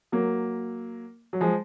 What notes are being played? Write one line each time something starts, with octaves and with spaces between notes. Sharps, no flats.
F#3 A#3
F#3
F3 G#3